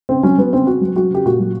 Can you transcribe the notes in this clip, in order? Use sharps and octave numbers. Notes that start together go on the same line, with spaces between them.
C#3 C4
F#3 C#4
F#3 B3
C#3 C4
C#3 F#4
F#3
F#3 F#4
C#3 G4
A#2 F#4
F#3